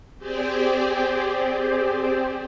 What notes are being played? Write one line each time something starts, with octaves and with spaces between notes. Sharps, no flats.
C4 G4 G#4 C5 D5